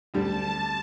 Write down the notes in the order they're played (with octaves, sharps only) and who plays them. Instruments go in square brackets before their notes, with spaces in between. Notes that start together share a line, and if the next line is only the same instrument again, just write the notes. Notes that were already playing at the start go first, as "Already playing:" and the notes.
[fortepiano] D2 D3 G3 [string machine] A5